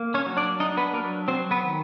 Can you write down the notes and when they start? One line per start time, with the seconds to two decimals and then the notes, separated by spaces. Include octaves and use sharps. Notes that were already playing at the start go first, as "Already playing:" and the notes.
Already playing: A#3
0.14 C#4 C#5
0.26 F#3
0.37 D4 D5
0.60 D4 D#4 D#5
0.77 B3 B4
0.93 F#3 A#3 A#4
1.28 F#3 C4 C5
1.51 B3 B4
1.63 D#3